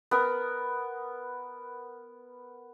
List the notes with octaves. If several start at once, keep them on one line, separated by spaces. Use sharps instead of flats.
B3 A#4